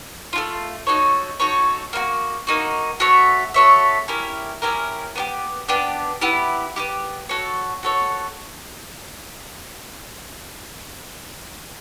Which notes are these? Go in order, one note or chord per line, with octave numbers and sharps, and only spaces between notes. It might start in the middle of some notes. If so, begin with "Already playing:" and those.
A3 D4 F4
D#4 F#4 A4 C#5
D#4 F#4 A4 C#5
A#3 D#4 F#4
A#3 D#4 F#4
F#4 A4 C#5 E5
F#4 A4 C#5 E5
C#4 E4 G4 A#4
C#4 E4 G4 A#4
B3 D4 G4
B3 D4 G4
B3 E4 G4
B3 E4 G4
F#4 A4 C#5
F#4 A4 C#5